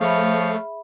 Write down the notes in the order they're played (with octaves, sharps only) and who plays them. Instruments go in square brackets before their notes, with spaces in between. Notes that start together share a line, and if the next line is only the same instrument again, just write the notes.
[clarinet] F3 [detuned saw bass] A3 [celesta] G#4 E5 B5 [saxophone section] C#5 F5